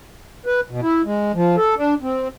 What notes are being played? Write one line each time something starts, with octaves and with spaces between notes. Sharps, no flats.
B4
B2
E4
G#3
F3
A4
D4
C4